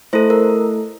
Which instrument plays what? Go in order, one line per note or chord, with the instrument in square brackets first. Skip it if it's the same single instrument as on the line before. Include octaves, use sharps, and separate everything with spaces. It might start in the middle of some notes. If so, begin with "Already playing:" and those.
[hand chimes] A3 E4 A4 C5
A#4